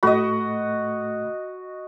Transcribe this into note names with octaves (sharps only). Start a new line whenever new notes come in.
A2 A3 F#4 D#5 B5